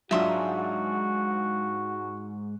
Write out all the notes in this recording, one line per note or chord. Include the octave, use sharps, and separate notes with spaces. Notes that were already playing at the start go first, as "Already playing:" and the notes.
G#2 F#3 D4 F4 F#4 E5 C6 D#6